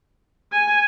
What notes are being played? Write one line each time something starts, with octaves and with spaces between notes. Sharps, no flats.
G#5